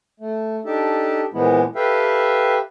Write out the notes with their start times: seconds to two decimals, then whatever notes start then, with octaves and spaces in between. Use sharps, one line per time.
0.20 A3
0.65 D4 D#4 G4 A4
1.33 A#2 E3 F3 G#3 B3 E4
1.76 G4 A4 B4 E5 F5 G5